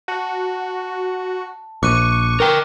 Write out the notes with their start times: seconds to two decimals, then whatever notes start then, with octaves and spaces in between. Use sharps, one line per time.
0.08 F#4 A5
1.83 A#1 C#6 D6 F#6 D#7
2.40 A#4 G5